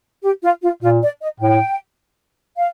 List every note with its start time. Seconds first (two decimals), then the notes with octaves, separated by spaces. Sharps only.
0.23 G4
0.43 F4
0.62 F4
0.82 A#2 F4
1.02 D5
1.21 D#5
1.40 A2 G5
2.58 F5